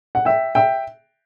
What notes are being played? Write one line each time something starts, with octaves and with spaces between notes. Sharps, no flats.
F#5
E5 G5
E5 G5